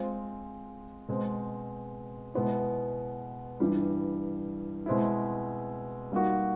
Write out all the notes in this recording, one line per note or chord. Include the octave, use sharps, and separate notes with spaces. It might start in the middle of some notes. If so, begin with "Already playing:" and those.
Already playing: G#3 C4 F4
B2 G#3 C4
B2 G#3 B3 E4
G2 E3 G3
B2 G#3 C4 E4
G3 A#3 D#4 F#4